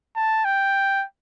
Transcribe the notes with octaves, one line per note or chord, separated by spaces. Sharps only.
A5
G5